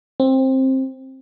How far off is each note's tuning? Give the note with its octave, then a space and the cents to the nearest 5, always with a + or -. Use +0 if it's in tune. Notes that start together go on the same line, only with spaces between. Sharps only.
C4 +15